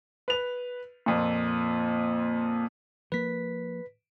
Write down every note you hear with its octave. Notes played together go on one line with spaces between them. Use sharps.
B4 F7
F2 A#2
F3 A#3 B4 B6